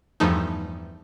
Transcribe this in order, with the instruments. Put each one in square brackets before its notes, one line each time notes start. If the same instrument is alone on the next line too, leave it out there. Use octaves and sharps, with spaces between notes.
[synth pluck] E2 G2 F3 A3 D#4